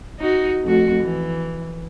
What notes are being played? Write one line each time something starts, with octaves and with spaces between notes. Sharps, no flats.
D#4 F#4
F2 A3 F#4
E3